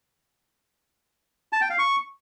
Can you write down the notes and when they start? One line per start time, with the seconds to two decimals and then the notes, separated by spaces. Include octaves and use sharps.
1.53 A5
1.61 G5
1.70 F5
1.79 C#6